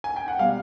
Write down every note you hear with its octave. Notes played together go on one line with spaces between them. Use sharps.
G#5
G5
F#5
B2 G3 F5